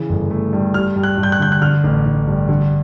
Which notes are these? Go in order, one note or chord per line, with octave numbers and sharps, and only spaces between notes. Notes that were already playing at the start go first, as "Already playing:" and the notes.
Already playing: C#3 E3
G1
A3
G2
G3 F6
G2
F#6
G2
G6
F#6
D3 G6
F#6
D3 F6
A1
A1
G2
D3